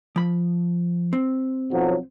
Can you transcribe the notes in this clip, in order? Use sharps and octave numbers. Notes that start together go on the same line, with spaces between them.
F3 B5
C4
B1 F3 F#3